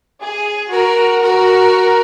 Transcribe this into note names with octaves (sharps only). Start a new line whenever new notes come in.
G#4
F#4 A#4
F#4 A#4